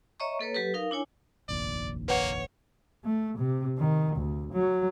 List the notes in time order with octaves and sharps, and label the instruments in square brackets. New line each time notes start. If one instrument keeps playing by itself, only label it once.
[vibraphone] C#5 D#5 E5 A#5 C#6
A#3 A4 B4 C#5
F#3 G4 A4 B4
D#4 A#4 F5
D4 E4 C#5 G#5
[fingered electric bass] F1 A#1 D#2 [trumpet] D5
[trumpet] A#3 [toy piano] B4 F#5 [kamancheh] C#5
[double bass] A3
C3
D#3
D2
F#3